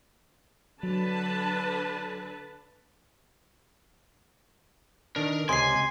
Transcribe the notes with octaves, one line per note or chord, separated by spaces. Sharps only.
D3 F#3 B4 A5
D#3 D4 A#4
C#2 C3 D#5 G#5 C6 C7